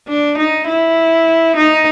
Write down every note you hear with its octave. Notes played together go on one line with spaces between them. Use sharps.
D4
D#4
E4
D#4